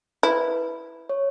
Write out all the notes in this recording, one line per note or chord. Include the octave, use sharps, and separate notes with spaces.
E4 B4
C#5